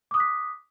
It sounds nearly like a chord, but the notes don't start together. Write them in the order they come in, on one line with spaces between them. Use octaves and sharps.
D6 D#6 F#6 B6